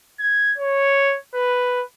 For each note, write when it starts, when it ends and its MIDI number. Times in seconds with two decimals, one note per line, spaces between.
0.20 0.53 92
0.58 1.17 73
1.34 1.82 71